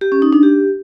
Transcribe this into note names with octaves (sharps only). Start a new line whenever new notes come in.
G4
C#4
D#4
D4
G4